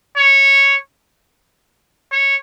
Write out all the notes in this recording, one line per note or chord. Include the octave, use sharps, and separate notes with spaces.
C#5
C#5